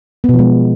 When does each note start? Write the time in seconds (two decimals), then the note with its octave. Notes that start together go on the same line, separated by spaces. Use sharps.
0.24 B3
0.29 B2
0.34 F3
0.39 G#3